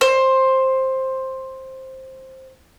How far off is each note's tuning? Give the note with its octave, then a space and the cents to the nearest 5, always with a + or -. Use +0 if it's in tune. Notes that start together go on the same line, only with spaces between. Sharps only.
C5 +10